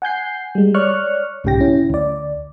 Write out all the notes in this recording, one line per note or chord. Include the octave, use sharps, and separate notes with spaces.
F#5 G#5 G6 C7
G3 G#3
C#5 D5 C#6 F6 F#6
B1 G#2 C#3 G4 G5 A#6
C#4 E4
D2 D5